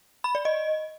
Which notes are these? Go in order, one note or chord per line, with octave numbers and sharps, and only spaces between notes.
B5
D5
D#5